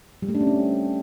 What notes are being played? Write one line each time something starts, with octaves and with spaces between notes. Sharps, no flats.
G3
A3
D4
C#4
C4